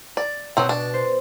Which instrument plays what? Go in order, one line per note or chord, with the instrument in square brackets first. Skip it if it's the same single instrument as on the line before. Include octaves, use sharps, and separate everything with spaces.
[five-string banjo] D5
[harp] B2 [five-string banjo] F#3 C4
[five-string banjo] D4
[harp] C5